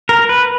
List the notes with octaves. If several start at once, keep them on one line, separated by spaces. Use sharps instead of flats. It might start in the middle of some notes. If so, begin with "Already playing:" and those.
A#4
B4